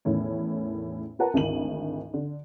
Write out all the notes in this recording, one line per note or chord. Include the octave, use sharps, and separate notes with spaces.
E2 A2 D#3 C#4
F4 A#4 B4 F#5 A5 A#5
G#1 D2 E4 A#4 D#7 F#7
D3